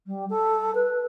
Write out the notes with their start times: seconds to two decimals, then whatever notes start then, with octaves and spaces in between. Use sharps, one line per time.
0.06 G3
0.29 A4
0.74 B4